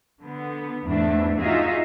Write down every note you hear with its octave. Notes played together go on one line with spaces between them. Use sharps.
D3 B3
E2 G#2 A3 D4 E5
D#4 F4 F#4 G#4 D#5 E5